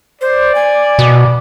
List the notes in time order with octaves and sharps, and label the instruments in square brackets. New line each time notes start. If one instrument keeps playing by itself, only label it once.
[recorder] C5 [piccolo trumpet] D5
[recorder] G#5
[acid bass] B2